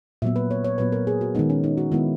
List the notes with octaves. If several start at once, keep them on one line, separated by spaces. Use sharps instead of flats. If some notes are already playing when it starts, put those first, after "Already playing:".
A#2 F#3 B3 E5
B4
C#5
C#5
A#2 F#3 B3 B4
A#4
G#4
F#4
D#3 G#3 B3 D#4
C#4
D#4
F#4
D#3 G#3 B3 E4